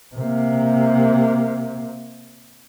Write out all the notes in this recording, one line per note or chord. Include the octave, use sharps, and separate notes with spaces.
C3 A#3